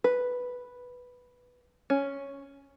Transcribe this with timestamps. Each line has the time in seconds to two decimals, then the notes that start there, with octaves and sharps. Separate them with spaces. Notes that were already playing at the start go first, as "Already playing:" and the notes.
0.04 B4
1.90 C#4